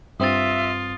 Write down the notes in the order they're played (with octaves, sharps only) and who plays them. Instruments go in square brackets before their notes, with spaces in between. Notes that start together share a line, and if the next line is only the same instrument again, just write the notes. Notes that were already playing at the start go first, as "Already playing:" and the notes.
[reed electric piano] G2 C4 [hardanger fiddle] F4 [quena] E5 [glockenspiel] D#6 A6